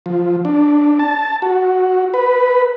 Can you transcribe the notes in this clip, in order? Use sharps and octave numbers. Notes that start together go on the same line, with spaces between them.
F3
D4
A5
F#4
B4